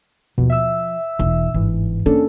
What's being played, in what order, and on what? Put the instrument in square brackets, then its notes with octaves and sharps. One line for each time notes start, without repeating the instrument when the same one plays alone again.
[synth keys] D#2 B2 [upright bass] F3
[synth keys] E5 E6
[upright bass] E1
[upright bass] G1 [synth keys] G#2 E3
[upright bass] A#3 [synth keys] C#4 D4 A4